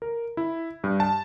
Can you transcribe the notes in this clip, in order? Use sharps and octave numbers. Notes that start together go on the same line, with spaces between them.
A#4
E4
G2
A5